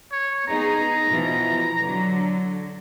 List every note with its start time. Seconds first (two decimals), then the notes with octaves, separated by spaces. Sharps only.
0.12 C#5
0.48 B3 D#4 G#4 A#5
1.09 B2 E3 F3
1.82 D3 F#3